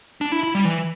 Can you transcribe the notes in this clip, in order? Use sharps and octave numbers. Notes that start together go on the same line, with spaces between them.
D4
E4
E4
G3
E3